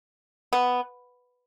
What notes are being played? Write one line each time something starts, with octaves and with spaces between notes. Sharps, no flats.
B3